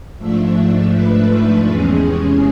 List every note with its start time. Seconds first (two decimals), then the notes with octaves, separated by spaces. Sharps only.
0.17 G#2 F3 A3 D4 E5
0.54 E5
0.92 B4
1.66 E2 C3 E3 G#3 C#4 G#4